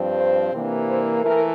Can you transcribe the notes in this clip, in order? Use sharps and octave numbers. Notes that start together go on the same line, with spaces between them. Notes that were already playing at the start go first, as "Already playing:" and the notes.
Already playing: G2 F3 C4
C5
C3 E3 A#3 D4
C5
E3 A3 A#4